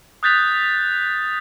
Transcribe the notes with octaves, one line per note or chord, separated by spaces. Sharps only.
D#6 F#6 G6 A6 B6 F7